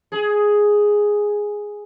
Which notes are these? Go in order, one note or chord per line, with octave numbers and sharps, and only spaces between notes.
G#4